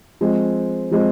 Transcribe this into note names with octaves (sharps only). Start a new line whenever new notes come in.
F3 G#3 C4
F3 G#3 C4